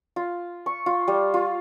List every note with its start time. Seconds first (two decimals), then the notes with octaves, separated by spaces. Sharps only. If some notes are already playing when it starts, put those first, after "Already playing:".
0.16 F4
0.66 C#6
0.86 F4
1.08 G3
1.34 F4